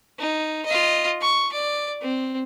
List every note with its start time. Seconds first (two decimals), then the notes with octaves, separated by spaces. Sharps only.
0.19 D#4
0.66 F4 D#5
1.21 C#6
1.52 D5
2.02 C4